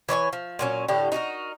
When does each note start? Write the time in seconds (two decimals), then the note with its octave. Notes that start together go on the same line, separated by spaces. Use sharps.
0.09 E3 C#5 D5 G#5
0.33 F3
0.59 A#2 F#3 C#4
0.88 A2 D3 G4
1.12 D#4 F#4 G4 A#4